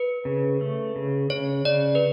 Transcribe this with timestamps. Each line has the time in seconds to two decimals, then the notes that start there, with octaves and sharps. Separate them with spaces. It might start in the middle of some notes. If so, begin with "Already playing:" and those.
Already playing: B4
0.25 C#3
0.61 A3
0.96 C#3
1.30 C#3 C#5
1.65 C#3 D5
1.95 B4